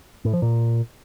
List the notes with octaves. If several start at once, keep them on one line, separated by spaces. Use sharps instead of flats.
A2
F3
A#2